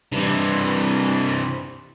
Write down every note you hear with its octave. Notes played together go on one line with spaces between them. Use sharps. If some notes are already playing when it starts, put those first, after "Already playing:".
G2 C3 E3